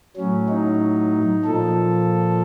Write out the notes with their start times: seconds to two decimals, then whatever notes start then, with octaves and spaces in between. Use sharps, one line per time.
0.17 A2 F#3 C#4
0.49 D#4
1.45 A#2 F3 A4